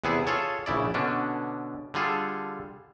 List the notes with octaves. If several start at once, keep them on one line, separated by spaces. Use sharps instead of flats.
E2 C3 B3 E4 G#4
F4 G#4 A4 C#5
A#1 C#3 E4 D5
B2 D3 C#4 D4
D3 G3 F4 G#4 A4